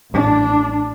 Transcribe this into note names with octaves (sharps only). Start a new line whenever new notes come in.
A1 D4